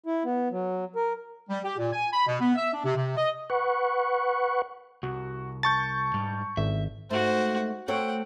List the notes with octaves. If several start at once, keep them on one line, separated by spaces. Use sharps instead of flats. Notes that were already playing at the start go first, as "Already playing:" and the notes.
E4
B3
F#3
A#4
G3
G4
A#2
G#5
B5
B2
B3
E5
D4
C3
C3
D#5
B4 F#5 C#6
C2 F#4
A5 C#6 G6 A6
G#2 G3
G#1 E5
G#2 A3 F#4 C5
A3 C4 C#5 F#5 G5